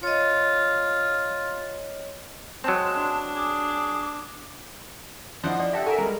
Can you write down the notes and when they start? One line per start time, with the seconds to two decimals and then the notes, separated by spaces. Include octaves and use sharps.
0.03 F4 C#5 D#5
2.64 F#3 G#3 C4 A5
2.95 D4
3.35 G#4 D6
5.44 F3 D4 E4 C5 D#5 F#5
5.60 D5
5.73 G4 A4 E5 F#5
5.86 F#4 A4 A#4 E5 G#5
5.98 G3 G#3 A#4